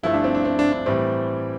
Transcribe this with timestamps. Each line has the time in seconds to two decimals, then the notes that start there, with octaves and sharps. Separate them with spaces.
0.03 G1 G2 F3 A3 E4
0.14 D4
0.24 C4
0.35 D4
0.45 C4
0.59 D4
0.73 D4
0.86 A2 E3 G3 C4